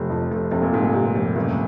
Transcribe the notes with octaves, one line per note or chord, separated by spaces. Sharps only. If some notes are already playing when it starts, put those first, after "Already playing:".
Already playing: F1 C3
F2
F1
F1 C3
A#2
F1 G#2
A#2
C3
F1
F#1